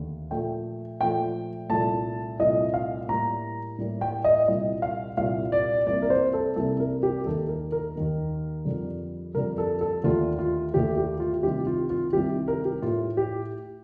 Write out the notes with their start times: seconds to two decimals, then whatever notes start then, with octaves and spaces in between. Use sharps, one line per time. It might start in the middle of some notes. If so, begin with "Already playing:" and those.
Already playing: D#2 D3 A3
0.31 A#2 F3 A3 G5
1.00 A#2 F3 A3 G5
1.70 C2 A#2 A3 A5
2.39 C2 A#2 A3 D#5
2.74 F5
3.08 A2 G3 A#3 A#5
3.78 A2 G3 A#3
4.01 G5
4.24 D#5
4.48 C2 A#2 G3 D#5
4.82 F5
5.17 C2 A#2 G3 F5
5.52 D5
5.87 C2 C3 G3 A#3 D5
6.02 A#4
6.10 C5
6.33 A4
6.56 C2 C3 G3 A#3 A4
6.80 A#4
7.03 G4
7.26 D#2 D#3 A#3 A4
7.49 A#4
7.72 A#4
7.95 D#2 D#3 A#3
8.65 F2 D3 G3
9.34 F2 D3 G3 A#4
9.58 A4
9.81 A4
10.04 D#2 D3 A3 F4
10.39 F4
10.74 D#2 D3 A3 G4
10.97 G4
11.20 F4
11.33 F4
11.43 C2 C3 D#3 G4
11.67 F4
11.90 F4
12.13 C2 C3 D#3 G4
12.48 A#4
12.65 G4
12.82 A2 A3 F4
13.17 G4